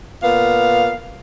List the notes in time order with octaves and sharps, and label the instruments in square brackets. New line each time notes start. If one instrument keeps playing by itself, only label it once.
[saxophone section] A#2 B3 F5